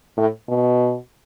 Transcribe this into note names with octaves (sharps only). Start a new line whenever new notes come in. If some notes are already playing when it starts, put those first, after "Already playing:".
A2
B2